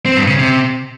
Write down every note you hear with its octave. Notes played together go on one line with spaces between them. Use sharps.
C4
G2
C#3
C3